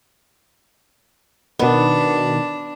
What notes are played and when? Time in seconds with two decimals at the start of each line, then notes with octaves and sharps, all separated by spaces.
1.59 B2 D#3 B3 D4